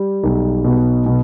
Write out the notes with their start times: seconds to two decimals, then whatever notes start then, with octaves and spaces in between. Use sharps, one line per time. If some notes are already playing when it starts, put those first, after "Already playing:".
Already playing: G3
0.24 B1
0.64 B2
1.06 B2